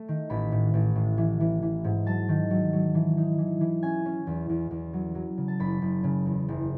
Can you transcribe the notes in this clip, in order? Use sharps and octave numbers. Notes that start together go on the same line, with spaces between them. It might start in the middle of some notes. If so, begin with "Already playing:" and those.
Already playing: A3
D#3
A1 B5
A2
A1
A2
E3
E3
E3
G#2
F#3 A5
D#3
F#3
F#3
E3
D#4
E3
E3
C#4 G#5
C#4
E2
E2
E2
F#3
F#3
C#3
A5
F#1 B5
F#1
C#3
E2
F#1